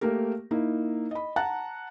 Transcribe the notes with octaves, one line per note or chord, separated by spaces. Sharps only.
A3 A#3 G4 A#4
A#3 D#4 E4
D#5 B5
F#5 A5 A#5 F#6